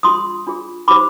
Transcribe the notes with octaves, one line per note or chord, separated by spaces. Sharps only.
D4 F4 G#4 C6 D#6
D4 F4 G#4
D#4 G4 C5 B5 D6